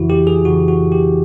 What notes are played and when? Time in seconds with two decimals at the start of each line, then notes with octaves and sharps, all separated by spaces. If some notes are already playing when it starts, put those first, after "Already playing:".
Already playing: F2 C#3 E3 E4 F#4
0.10 G4
0.27 G#4
0.45 F2 C#3 E3 F#4
0.68 F#4
0.92 G4